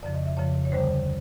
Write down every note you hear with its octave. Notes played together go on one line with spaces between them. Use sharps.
F2 C#3 F3 D5
D#5
E5
F2 C#3 F3 C#5
C#5
D2 D3 G3 C5